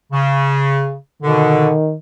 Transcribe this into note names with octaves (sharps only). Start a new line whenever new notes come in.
C#3
B2 D3 D#3